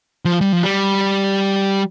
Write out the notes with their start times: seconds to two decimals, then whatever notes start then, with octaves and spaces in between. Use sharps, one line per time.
0.25 F3
0.41 G3
0.52 F3
0.63 G3